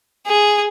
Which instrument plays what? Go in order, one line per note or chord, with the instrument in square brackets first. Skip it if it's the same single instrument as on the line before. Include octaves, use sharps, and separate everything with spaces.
[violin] G#4